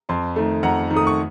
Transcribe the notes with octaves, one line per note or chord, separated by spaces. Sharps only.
F2 A5 C6
D#3 A3
F2 F#5 A#5
D#3
A3 D#6
C#6